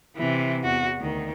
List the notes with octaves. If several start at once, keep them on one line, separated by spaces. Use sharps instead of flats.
C3 E3
E2 F#4
D2 D#3